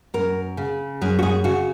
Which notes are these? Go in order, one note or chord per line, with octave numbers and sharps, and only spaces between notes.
F#2 A#4
C#3
F#2 G#4
F#4
G#4
C#3 F#4